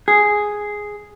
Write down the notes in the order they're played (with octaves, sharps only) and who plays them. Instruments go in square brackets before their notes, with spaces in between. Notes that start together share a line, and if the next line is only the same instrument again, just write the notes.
[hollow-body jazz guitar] G#4